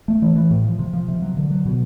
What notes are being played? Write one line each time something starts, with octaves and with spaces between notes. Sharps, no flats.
A3
E3
E3
A2
F3
C3
F3
C3
F#3
D3
F#3
B2